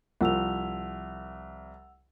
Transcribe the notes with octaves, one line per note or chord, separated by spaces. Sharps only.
C2 F3 F#5 E6 F7